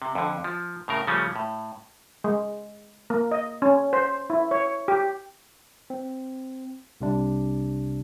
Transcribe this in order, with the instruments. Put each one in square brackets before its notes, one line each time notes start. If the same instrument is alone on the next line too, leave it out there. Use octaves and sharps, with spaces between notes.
[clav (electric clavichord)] C3
F2 D3
F3
A2 C#3 A#4
C#3 F3 G3 A3 C#4
A2
[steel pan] G#3
A#3
D#5
C#4
C5
E4
C#5
G4
[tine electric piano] C4
C2 C3 D4